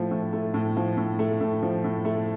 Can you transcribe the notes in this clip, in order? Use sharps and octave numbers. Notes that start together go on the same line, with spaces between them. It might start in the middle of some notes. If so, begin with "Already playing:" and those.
Already playing: A2 F3 A3
A2
A3
A2
F3
A2
A3
A2
F3
A2
A3